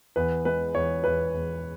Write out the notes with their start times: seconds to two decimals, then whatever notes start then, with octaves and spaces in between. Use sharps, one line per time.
0.16 E2 B4
0.45 G#3 B4
0.75 E2 C#5
1.04 E2 B4
1.34 E2